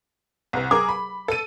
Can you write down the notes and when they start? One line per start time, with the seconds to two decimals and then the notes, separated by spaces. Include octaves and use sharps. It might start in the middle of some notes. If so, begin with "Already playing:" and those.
0.53 C2 C3
0.71 G#4 A#4 D6
0.89 B5
1.28 A4 D#7